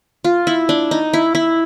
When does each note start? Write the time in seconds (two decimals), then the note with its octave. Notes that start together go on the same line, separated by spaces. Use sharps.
0.24 F4
0.47 E4
0.69 D4
0.91 D#4
1.13 E4
1.35 E4